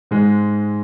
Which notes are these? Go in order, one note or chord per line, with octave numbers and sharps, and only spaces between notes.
G#2 G#3